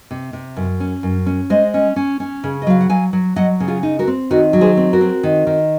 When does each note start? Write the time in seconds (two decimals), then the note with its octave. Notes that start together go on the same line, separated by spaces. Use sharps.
0.11 C3
0.33 C3
0.56 F#2
0.80 C#4
1.03 F#2
1.26 C#4
1.50 G#3 C5 D#5
1.74 C#4
1.96 C#4
2.20 C#4
2.44 C#3
2.62 D#5
2.67 F#3 F5
2.81 F#5
2.90 F#3 F5 G#5
3.13 F#3
3.36 F#3 D#5 F#5
3.60 C#3
3.68 F4 G#4
3.83 D#4
3.99 F#4 A#4
4.07 C4
4.31 D#3 F#4 A#4
4.53 F#3
4.61 G#4 C5
4.77 C4
4.93 F#4 A#4
5.01 C4
5.23 D#3
5.47 D#3